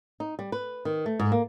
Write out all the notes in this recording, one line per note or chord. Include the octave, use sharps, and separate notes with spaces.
D#4
G3
B4
D#3
A3
G#2
A#3